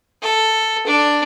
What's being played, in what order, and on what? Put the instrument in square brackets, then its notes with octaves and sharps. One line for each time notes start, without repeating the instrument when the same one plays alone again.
[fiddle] A4
D4